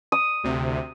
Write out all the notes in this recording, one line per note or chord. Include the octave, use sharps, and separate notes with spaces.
D#6
D2 C3